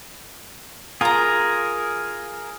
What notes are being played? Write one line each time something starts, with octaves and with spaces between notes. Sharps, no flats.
F4 G#4 A#4 A#5